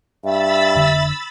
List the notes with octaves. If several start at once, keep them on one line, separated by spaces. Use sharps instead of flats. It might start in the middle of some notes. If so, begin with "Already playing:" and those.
G2 E5 B5 E6 A6
F1 D3